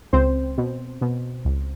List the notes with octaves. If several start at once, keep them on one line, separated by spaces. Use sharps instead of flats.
C#2 C4 C5
B2
B2
C#2